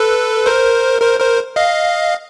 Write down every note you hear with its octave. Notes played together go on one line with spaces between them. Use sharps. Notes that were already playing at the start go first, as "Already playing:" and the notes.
Already playing: A4 B4
A#4 C5
A#4 C5
A#4 C5
D#5 F5